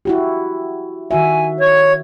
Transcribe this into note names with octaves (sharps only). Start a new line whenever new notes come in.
E4 F#4 G4
D#3 F#4 E5 G#5
C#5 G#6